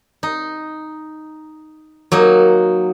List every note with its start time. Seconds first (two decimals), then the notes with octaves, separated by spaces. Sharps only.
0.23 D#4
2.12 F#3 A#3 D#4